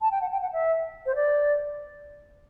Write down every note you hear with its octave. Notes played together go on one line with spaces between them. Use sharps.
A5
G5
F#5
G5
F#5
E5
C5
D5